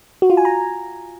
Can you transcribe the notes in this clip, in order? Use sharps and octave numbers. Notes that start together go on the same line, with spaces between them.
F#4
F4
G#5
A#5